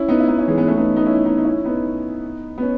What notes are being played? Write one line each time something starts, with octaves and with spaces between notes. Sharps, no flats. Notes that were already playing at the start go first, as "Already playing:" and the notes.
Already playing: C#4 E4
B3 D#4
E4
B3 D#4
C#4 E4
E3 G#3
G#3 B3
A3 C#4
B3 D#4
B3 D#4
C#4 E4
B3 D#4
D#4
C#4 E4
B3 D#4
B3
C#4